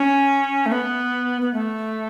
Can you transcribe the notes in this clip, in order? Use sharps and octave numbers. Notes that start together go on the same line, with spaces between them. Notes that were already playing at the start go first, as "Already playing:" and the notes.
Already playing: C#4
A3
B3
B3
A3